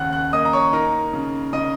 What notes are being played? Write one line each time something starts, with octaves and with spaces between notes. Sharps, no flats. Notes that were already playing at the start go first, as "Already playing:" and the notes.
Already playing: D#2 C#3 F#5 F#6
F#5 F#6
A#3 D#5 D#6
A#5
C#5 C#6
D#4 A#4 A#5
C#3
C#3 D#5 D#6